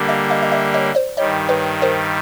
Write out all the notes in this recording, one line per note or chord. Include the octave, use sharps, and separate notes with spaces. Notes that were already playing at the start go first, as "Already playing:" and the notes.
Already playing: D3 G3 A#3
D#5 F5
D#5 F5
D#5
D5 E5
C#5 D#5
C5 D5
G2 D#3 G3 C#5 D#5
B4 C#5
A#4 C5